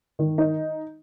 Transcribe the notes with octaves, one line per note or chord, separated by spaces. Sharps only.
D#3
D#4